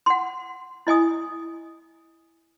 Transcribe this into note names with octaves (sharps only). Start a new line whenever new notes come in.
F#5 C6
E4 D#5 G#5 D#6